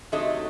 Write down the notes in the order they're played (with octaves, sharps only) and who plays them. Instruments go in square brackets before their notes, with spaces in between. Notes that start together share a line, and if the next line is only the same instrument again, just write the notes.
[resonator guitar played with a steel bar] C3 F#3 A3 D#4 D#5